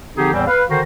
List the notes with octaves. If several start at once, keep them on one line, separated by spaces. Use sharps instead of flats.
D3 F3 C4 D#4 G4 G#4
E2 A2 E3 G3 C4
B4 F5
D3 D#3 F#4 A#4 C5